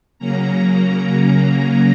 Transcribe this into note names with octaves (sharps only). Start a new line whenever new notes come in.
C#3 F#3 A#3 C#4 A#5